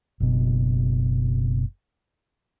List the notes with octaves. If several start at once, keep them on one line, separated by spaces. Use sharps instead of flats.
F#1 B2